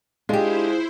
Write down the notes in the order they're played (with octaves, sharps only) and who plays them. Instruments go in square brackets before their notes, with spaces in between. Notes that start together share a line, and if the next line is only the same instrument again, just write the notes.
[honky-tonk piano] G#3 [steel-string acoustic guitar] D4 G4 [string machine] E4 C5 [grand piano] F4 G#4